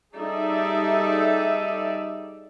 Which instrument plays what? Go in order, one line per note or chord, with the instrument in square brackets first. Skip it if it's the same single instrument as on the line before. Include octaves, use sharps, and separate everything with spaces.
[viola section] G3 D#4 G#4 A4 D5 E5